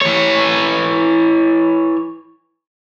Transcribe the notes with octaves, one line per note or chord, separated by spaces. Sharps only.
E3 C#5